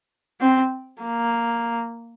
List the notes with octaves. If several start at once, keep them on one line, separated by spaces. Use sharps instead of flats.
C4
A#3